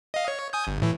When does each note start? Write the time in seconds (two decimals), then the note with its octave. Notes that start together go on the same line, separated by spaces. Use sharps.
0.14 D#5 F5
0.28 C#5
0.53 G#5 D#6 G6
0.67 G1
0.82 A2 E3